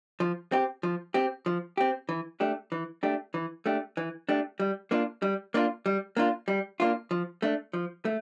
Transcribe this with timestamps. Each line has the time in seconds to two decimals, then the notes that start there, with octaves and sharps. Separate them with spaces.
0.20 F3
0.52 C4 G4
0.83 F3
1.14 C4 G4
1.46 F3
1.77 C4 G4
2.09 E3
2.40 A3 D4 G4
2.72 E3
3.03 A3 D4 G4
3.34 E3
3.66 A3 D4 G4
3.97 E3
4.29 A3 D4 G4
4.60 G3
4.91 A#3 D4 F4
5.22 G3
5.54 A#3 D4 F4
5.86 G3
6.17 A#3 D4 F4
6.48 G3
6.80 A#3 D4 F4
7.11 F3
7.42 A3 D4
7.73 F3
8.05 A3